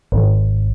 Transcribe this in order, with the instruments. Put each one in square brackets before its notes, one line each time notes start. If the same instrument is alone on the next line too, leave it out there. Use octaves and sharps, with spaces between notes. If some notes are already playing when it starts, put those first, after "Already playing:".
[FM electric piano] G#1